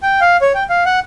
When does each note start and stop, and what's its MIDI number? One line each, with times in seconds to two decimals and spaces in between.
0.03 0.20 79
0.21 0.37 77
0.41 0.53 73
0.55 0.64 79
0.69 0.84 77
0.85 1.00 78